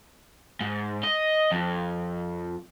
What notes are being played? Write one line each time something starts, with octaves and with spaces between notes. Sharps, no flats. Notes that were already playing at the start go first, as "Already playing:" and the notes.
G#2
D#5
F2